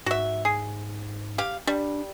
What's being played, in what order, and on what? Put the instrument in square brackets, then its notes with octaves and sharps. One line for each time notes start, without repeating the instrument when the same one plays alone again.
[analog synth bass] G#2 [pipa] F#4 E5
[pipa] G#4
G4 F5
[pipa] G3 [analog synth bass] D4